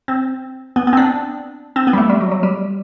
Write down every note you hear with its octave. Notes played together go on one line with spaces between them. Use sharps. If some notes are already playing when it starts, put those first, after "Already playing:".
C4
B3
B3
C4
D4
C4
B3
G3
A3
G3
F#3
F#3
G3